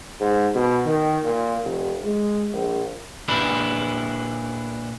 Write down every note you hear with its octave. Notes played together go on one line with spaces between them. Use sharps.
G#2
B2
D#3
A#2
F1
G#3
A#1
A#2 D4 E4 B4